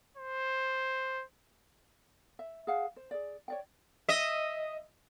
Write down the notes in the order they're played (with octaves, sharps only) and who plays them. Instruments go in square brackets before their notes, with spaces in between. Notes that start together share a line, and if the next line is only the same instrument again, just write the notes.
[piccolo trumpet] C5
[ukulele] E5
G#4 F5 F#5
C5
G#4 D5
C#5 D5 G5
[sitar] D#5 E5